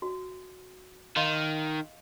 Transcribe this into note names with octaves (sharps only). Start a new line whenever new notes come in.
F#4
D#3 D#5 F5 C6